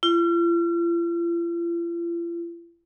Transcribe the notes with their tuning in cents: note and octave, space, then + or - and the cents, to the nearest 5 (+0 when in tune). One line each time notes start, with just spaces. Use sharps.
F4 -45